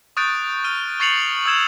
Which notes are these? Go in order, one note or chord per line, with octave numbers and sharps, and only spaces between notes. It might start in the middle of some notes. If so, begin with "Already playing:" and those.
C#6 D#6 F#6 G6 A6 D7
F6 D#7 G7
C#6 A6 C7 C#7 F7 F#7
D#6 E6 G#6 E7 F7